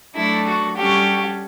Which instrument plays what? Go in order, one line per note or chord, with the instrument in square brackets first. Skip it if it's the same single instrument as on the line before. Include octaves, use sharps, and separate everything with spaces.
[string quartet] F#3 A3 D4 A4 [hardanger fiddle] E4
[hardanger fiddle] F#4
[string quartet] G3 C#4 F#4 A4 [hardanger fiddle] G4